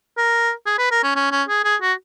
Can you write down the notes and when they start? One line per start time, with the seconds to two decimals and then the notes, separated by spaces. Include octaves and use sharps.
0.17 A#4
0.66 G#4
0.78 B4
0.91 A#4
1.03 C#4
1.15 C#4
1.32 C#4
1.48 G#4
1.64 G#4
1.82 F#4